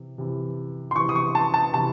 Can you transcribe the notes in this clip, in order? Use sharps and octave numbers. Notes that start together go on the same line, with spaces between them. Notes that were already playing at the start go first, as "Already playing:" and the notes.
Already playing: C3 E3
C3 E3
C6
C3 E3 C#6
D#6
C#6
A5
A5
C3 E3 A5